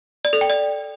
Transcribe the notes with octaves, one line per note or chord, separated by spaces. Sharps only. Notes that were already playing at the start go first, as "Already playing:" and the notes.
D5
A4
G5
D5